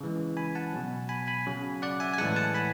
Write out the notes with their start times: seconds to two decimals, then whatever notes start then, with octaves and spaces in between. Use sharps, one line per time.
0.01 C#3 E3 G#3
0.37 G#5 B5
0.55 F#5 A5
0.73 B2 F#3
1.09 G#5 B5
1.27 G#5 B5
1.46 C#3 F#3
1.82 D5 F#5
2.00 E5 G#5
2.14 G#5
2.18 A2 E3 G#3 F#5 A5
2.36 F#5 A5
2.55 G#5 B5